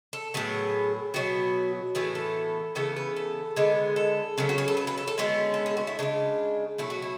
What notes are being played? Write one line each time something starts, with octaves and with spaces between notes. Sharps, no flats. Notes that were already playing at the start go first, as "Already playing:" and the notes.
A4
A2 F#3 B3 G#4
B2 F#3 B3 F#4
A2 E3 B3 G#4
A4
C#3 E3 B3 A4
B4
A4
D3 G#3 B3
A4
C#3 F#3 B3
F#4
G#4
A4
B4
B4
A4
A4
D3 G#3 B3 C#4
A4
G#4
F#4
E4
C#3 E3 G#3 D4
B2 F#3 A3 E4
F#4
E4